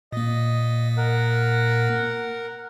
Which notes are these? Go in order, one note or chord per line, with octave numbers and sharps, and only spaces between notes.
A#2 A#3 D#5
A#4 F#5